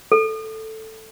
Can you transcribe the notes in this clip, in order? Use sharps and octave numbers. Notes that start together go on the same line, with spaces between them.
A4